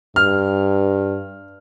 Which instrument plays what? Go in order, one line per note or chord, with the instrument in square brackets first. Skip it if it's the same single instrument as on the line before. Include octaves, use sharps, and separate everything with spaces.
[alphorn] G2 [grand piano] F6